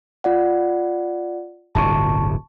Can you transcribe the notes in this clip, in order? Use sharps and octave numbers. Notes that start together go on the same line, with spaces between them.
F4 D5 F#5
D1 G1 C3 A5 C#6